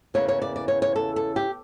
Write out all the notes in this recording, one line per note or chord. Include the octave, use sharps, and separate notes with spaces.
E2 C#3 E3 A#3 C#5
C#5
D5
D5
C#5
C#5
A4
A4
G4